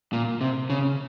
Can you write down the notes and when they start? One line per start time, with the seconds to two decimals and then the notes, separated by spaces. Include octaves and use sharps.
0.13 A#2
0.41 C3
0.70 C#3